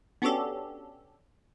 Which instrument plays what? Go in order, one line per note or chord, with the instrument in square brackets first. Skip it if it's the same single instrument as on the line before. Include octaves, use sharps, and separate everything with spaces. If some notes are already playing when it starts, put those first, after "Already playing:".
[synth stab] B3 C#4 D4 F#4 G4 A4